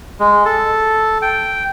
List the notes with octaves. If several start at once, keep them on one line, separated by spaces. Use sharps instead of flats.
G#3
A4
G5